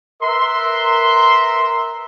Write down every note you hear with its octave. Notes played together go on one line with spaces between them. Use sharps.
A#4 B4 E5 A#5 C6